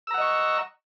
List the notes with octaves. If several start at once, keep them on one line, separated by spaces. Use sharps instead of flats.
D#5 F#5 A#5 C#6 E6